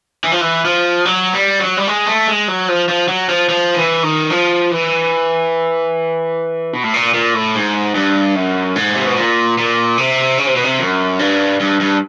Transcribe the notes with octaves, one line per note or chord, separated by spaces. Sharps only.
E3
F3
E3
F3
F#3
G3
F#3
G3
G#3
A3
G#3
F#3
F3
F3
F#3
F3
F3
E3
D#3
F3
E3
B2
A2
A#2
A#2
A2
G#2
G2
F#2
G#2
C3
B2
A#2
A#2
C3
C#3
C3
B2
C3
F#2
G2
G2
G2